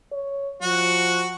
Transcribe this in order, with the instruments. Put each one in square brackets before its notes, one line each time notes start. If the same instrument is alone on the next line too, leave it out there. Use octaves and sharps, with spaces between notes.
[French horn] C#5
[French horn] F3 [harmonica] F#4